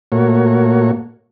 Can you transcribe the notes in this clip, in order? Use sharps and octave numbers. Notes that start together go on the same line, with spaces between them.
A#2 A3 A#3 F#4 C#5